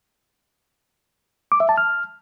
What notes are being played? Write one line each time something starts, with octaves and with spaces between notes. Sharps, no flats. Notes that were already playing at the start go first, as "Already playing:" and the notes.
D6
E5
A5
F6